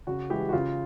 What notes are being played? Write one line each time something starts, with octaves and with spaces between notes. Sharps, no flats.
C#3 F#4
E3 G#3 G4
F#4
C#3 F4